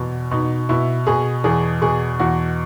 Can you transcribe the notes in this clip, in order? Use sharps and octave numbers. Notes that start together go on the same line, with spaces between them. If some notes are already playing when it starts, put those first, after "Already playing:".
Already playing: E2 B2
B2 D#4
B2 E4
B2 G#4
E2 G#4
B2 G#4
E2 F#4